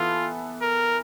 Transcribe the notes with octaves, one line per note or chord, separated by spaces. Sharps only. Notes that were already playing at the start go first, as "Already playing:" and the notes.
Already playing: E3 B3 F4 A4
A#4